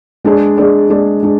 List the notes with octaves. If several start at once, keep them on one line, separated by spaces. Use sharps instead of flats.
G#3 D4 G#4 D5
G#3 D4 G#4 D5
G#3 D4 G#4 D5
G#3 D4